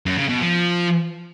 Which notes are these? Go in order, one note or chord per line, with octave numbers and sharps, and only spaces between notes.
F#2
C#3
B2
F3